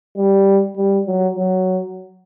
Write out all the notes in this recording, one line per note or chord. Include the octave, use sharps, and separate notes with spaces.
G3
G3
F#3
F#3